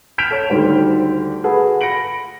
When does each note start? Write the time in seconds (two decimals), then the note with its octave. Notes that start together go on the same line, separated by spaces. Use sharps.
0.18 F6 G6 B6 D7 E7 F7
0.31 A4 C#5
0.50 D2 D3 D#3 G3 C5
1.44 F#4 G#4 A4 B4
1.81 B5 A#6 C#7 D7 F#7